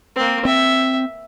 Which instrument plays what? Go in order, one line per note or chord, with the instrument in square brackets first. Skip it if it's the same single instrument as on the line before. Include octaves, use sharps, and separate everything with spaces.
[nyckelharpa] A#3 C4
[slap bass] C4 [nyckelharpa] E5